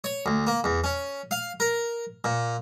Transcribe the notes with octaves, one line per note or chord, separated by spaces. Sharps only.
C#5
D2
A#3
E2
C#4
F5
A#4
A#2